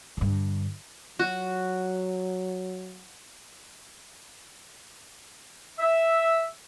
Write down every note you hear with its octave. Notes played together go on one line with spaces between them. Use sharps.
G2 D3
F#3 F#4
E5